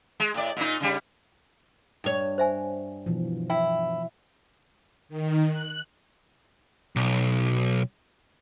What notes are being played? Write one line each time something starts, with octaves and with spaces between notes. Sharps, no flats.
G#3
A2 D5
A#2 D#4
C#3 G3
G2 C#5
C5 E5 G#5
B2 E3 F3
E4 G5
D#3
F#6
B1